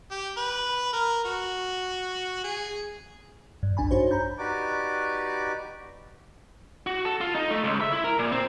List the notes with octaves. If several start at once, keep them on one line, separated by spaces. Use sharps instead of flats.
G4
B4
A#4
F#4
G#4
G2
A#1 F#2 D4 G#5 B5
D4 D#4 F#4 C5 C#5
A#5 B5 G6
D#4 F#4 G4 B4 D5 D6
F#4
A4
F4
D#4
A3
C#2
E5
E4
A#4
A#2
C4